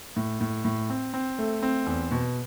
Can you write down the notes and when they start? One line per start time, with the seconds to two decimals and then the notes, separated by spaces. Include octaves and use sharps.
0.16 A2
0.41 A2
0.65 A2
0.90 C4
1.14 C4
1.39 A3
1.62 C4
1.86 E2
2.11 B2